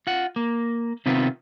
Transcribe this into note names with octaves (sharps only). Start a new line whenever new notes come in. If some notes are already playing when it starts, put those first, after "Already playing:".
F4 F#5
A#3
C3 D#3 B3 C4 F4